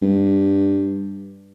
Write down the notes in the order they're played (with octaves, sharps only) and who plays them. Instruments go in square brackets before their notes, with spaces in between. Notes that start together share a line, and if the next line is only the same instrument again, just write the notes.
[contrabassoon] G2